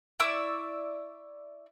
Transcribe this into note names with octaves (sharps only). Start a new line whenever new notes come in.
E4 D5 C#6 E6